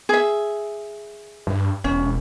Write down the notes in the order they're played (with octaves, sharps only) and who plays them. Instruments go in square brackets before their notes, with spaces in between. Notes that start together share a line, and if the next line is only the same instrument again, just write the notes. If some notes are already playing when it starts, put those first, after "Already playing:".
[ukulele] G#4 E5
[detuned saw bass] G2
[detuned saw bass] E1 [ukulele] C#4